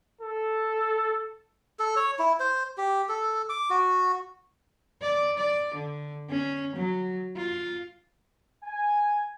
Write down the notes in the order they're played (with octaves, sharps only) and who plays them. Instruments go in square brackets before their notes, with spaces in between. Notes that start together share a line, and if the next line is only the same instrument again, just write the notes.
[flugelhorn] A4
[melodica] A4
C#5
E4
C5
G4
A4
D6
F#4
[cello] D5
D5
D3
C#4
F#3
F4
[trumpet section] G#5